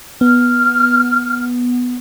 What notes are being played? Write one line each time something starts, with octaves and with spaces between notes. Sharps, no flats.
B3 F6